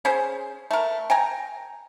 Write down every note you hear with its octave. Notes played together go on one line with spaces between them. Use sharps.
C#4 G#4 C5
A3 A#4
G5 G#5 A#5